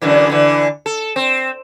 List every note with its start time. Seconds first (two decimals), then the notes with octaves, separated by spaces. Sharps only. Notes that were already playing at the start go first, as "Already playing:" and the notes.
0.02 F#2 D3 E3
0.30 D3 E3
0.86 A4
1.16 C4